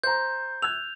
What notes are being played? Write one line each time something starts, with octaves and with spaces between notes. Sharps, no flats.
C5 A#5 G6
E6 F#6 G#6 F7